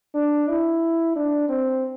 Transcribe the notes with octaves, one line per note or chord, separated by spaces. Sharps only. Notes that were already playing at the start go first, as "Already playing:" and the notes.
D4
E4
D4
C4